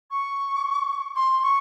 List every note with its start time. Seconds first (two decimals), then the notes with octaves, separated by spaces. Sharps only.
0.11 C#6
1.16 C6
1.43 C#6